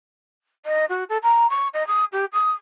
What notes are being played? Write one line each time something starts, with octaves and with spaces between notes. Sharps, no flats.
D#5
F#4
A4
A#5
C#6
D#5
D#6
G4
D#6